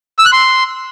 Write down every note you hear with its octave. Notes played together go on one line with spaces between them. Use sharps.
E6
F#6
C6